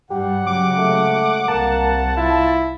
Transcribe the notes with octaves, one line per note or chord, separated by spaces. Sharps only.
G2 G3 G4 F#5
C#3 F#3 G#3 D6
A3
C2 A#3 A5
E4 F4